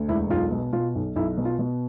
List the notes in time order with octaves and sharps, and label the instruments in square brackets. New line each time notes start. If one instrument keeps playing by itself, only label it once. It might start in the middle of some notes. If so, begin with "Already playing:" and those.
Already playing: [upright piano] D2
E1 E4
B1 F4
B2
B2 F4
B1
B1 E4
B2
F4
B2